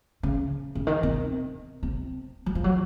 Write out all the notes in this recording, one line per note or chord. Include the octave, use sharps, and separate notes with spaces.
C#3
C#3
D#3
C3
C3
F#3
F3
F#3